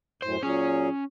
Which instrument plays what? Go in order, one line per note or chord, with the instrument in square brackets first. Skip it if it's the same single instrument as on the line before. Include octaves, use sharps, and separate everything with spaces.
[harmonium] F#2 A2 [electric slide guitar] C5
[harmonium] A#2 F#3 G#4 [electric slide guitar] C#4